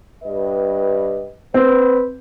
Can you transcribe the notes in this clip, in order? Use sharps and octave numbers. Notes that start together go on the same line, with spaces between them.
G2 B4 D#5
C4 B4